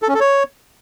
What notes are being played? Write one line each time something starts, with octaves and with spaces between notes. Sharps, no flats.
A4
C#4
A4
C#5